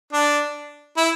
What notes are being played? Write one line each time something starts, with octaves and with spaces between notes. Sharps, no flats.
D4
E4